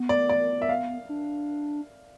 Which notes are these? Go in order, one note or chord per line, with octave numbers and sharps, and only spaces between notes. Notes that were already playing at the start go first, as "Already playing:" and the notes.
Already playing: B3
D5
D5
E5
F5
D4